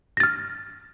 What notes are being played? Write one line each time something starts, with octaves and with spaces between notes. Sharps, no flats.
F6 A6 A#6